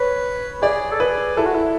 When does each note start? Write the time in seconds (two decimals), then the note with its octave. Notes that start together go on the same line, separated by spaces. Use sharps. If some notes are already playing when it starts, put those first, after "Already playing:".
Already playing: B4 C#5
0.62 G#4 D5
0.92 A4
1.00 G#4 B4
1.37 E4 A4
1.46 F#4
1.54 E4